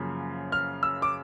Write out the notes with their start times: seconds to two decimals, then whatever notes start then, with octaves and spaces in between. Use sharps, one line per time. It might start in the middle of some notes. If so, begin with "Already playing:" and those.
Already playing: F#2 C#3 F3 A#3
0.52 F6
0.83 E6
1.02 D6